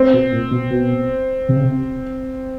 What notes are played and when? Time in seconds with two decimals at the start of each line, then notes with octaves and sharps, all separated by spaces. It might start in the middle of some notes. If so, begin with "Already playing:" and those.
Already playing: C4
0.13 B2
0.32 A#2
0.51 B2
0.70 B2
1.49 C3
1.56 C#3
1.64 C3